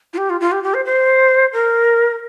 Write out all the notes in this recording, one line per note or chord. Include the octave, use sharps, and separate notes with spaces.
F4
G4
F4
F4
G4
G4
C5
C5
A#4